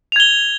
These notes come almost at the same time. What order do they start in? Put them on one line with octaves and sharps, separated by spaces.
F7 G#6 G7